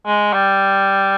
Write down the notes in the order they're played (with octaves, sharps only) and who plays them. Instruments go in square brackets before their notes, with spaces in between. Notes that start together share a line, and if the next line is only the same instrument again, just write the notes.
[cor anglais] G#3
G3